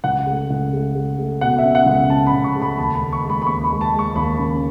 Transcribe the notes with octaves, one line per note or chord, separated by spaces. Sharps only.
C#2 F#5
A3
C#2
A3
A3
A3
B2 F#5
E5
C#4
F#5
C#2
C#4 A5
B5
C#2
C#6
A3
B5
D#2 A5
B5
D#2
C#6
G#3
B5
B5
D#2 C#6
B5
G#3
A5
G#3
C#6
D#2 B5
C#3